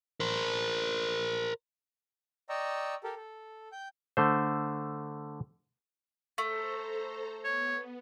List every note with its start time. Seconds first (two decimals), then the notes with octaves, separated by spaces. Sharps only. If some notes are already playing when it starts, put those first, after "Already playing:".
0.20 A#4 C5
2.49 D5 D#5 G5 A#5 C#6 E6
3.04 G4 A4 A#4
3.17 A4
3.72 G5 G6
4.17 D3 A3 C5
6.38 A3 A4 C5 A#5
7.44 B3 C#5